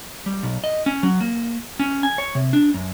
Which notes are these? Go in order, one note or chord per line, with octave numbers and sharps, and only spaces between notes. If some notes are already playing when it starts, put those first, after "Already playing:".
G3
B1
D#5
C#4
F#3
A#3
C#4
G#5
C#5
C3
D4
F#2